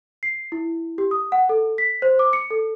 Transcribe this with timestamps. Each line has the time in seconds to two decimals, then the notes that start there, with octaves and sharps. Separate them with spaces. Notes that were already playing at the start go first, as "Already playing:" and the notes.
0.23 C7
0.52 E4
0.98 G4
1.11 D#6
1.32 F#5
1.49 A4
1.78 B6
2.02 C5
2.19 D6
2.33 C#7
2.50 A4